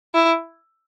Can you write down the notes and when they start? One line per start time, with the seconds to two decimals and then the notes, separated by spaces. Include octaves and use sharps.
0.14 E4